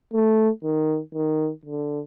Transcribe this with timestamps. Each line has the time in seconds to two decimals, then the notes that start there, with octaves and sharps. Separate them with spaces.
0.13 A3
0.64 D#3
1.14 D#3
1.65 D3